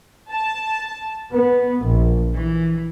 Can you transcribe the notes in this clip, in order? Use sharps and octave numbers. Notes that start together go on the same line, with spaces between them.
A5
B3
A#1
E3